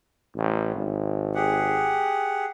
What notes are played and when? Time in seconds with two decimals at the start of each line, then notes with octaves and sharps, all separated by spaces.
0.36 A1
0.76 G#1
1.35 G4 G#4 F#5